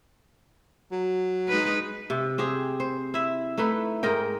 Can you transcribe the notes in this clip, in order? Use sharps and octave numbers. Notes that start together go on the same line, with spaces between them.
F#3
G#3 D#4 B4
C3
C4 G4 G#4
C5
E4 E5
A3 D#4 E4 B4
G#2 A#4 D#5 G5